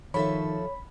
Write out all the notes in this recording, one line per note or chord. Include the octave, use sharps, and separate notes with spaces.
D#3 F3 A4 C#5 E5 B5